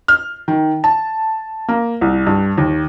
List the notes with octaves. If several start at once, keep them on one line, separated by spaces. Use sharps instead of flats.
F6
D#3
A5
A#3
C2
G2
D#2